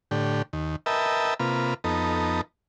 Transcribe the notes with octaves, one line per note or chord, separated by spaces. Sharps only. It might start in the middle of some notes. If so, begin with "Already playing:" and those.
A2 D3 G4
D#2
A#4 B4 D#5 E5 G5 A5
C3 A#3 F4 B4
F2 B3 D#4 A4 A#5